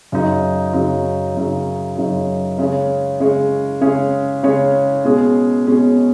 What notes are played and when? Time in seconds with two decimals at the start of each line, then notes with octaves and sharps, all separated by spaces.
0.12 F#2 C#3 F#3 D#4
0.73 F#2 C#3 F#3 D#4
1.35 F#2 C#3 F#3 D#4
1.96 F#2 C#3 F#3 D#4
2.58 C#3 G#3 C#4 G#4 C#5
3.20 C#3 G#3 C#4 G#4 C#5
3.81 C#3 G#3 C#4 G#4 C#5
4.43 C#3 G#3 C#4 G#4 C#5
5.04 B2 G#3 C#4 G#4
5.66 B2 G#3 C#4 G#4